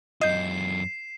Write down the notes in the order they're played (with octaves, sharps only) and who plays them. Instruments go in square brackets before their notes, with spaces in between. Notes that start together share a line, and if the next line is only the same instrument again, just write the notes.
[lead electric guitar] F#2 F4 [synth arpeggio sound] D#5 G6 [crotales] C7 E7